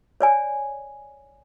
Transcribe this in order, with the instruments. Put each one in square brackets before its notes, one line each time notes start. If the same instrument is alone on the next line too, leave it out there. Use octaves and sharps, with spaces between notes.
[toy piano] C#5 D5 G#5